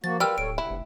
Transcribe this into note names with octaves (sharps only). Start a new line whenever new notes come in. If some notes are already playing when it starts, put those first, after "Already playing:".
F3 A#3 F#4 A6
G3 F4 A#4 B4 G5 E6 F6
D1 A4 C#5 D7
G2 C3 E4 F#5
F1